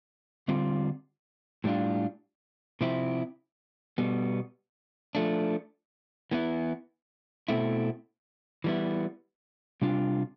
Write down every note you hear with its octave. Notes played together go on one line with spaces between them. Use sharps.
D3 G3 C4 F4
A2 G3 D4 F4
C3 F3 C4 E4
B2 G3 B3
F3 A3 D4
E3 B3 E4
B2 A3 C4 E4
E3 G3 B3 E4
C3 G3 D4 F4